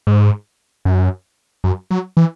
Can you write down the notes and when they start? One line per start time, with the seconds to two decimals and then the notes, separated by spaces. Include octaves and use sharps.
0.07 G#2
0.85 F#2
1.64 F#2
1.91 F#3
2.17 E3